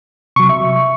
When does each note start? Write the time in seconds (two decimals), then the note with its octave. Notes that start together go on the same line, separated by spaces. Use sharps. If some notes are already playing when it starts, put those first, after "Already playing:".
0.36 C3 F#3 C#6
0.49 E5